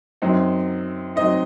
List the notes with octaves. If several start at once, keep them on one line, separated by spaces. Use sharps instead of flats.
F#2 F#3 C4 D#4
F#3 C4 D#4 D#5